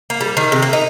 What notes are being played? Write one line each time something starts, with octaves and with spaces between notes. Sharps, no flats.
A#3
G3
D#3
C3
A#3
D#4